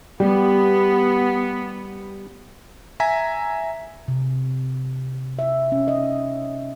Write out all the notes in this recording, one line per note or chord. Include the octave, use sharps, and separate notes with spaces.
G3 B3 G4
E5 G#5 A#5 B6
C3
E5
C#4
D#5